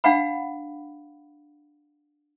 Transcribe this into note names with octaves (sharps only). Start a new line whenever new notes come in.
D4 F5 F#5 B5